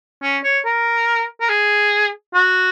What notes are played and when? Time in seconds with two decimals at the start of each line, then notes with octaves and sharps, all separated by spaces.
0.23 C#4
0.44 C#5
0.65 A#4
1.41 A#4
1.49 G#4
2.34 F#4